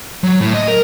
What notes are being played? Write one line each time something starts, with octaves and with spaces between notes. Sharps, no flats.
F#3
A2
D#5
A#4